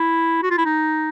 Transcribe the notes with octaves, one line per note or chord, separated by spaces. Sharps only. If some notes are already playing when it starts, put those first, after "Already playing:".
Already playing: E4
F#4
F4
E4
D#4